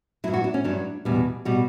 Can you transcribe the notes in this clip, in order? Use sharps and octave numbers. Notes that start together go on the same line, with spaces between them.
G2 F#3 E4
F#4
D4
C#4
G2 F#3 D4
E2 B2 G3
B2 G3 F#4